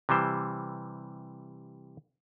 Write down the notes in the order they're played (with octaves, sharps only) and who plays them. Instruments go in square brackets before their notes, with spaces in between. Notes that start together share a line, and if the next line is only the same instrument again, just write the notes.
[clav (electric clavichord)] C3 E3 G3 C5